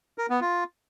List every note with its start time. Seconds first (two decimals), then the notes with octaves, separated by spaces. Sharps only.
0.18 A#4
0.30 B3
0.41 F4